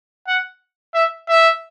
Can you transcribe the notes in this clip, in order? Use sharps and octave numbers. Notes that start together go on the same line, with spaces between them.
F#5
E5
E5